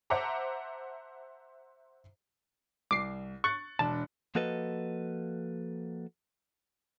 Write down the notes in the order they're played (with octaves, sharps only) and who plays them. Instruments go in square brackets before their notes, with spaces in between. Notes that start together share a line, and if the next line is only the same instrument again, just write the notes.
[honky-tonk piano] C5 E5 F#5 A5 A#5 D6
[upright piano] C2 [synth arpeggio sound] D6 C7
[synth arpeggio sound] C#6 [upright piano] F#6 A6 C#7
[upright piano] E1 D4 [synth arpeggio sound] A5
[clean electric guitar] F3 A#3 F#4 A4 B4 D#5